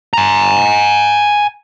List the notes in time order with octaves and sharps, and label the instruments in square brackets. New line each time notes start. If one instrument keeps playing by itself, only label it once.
[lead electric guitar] G#5 A#5